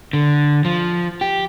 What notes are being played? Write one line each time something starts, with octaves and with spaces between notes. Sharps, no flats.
D3
F3
G4